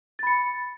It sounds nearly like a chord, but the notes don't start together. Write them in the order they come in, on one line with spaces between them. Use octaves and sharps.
A6 B5 C#7